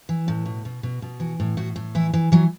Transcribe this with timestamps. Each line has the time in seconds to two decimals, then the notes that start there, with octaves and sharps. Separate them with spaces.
0.09 E3
0.28 A2
0.46 B2
0.65 B2
0.83 B2
1.02 B2
1.20 E3 F#4
1.40 A2
1.57 A2 F#4
1.76 A2
1.95 E3 E4
2.13 E3
2.32 E3 F#3